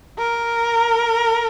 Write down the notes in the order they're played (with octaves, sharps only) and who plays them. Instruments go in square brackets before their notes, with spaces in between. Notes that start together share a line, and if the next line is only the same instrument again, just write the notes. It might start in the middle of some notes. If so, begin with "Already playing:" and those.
[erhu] A#4